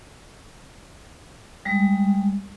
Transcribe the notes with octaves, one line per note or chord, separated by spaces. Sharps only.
G3 G#3